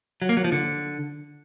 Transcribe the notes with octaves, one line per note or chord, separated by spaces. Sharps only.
F#3
A#3
F#3
F3
D3